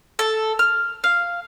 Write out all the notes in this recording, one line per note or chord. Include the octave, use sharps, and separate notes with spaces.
A4
F6
F5